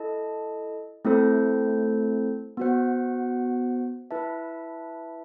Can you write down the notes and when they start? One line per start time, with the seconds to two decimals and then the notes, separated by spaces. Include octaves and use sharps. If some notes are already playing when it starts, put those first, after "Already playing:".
Already playing: E4 A4 D#5 A5
1.05 A3 C4 E4 A4 C5
2.57 B3 F#4 C5 F#5
4.11 E4 B4 E5 A5